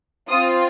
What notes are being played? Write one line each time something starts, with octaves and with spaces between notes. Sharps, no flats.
C4 F4 D#6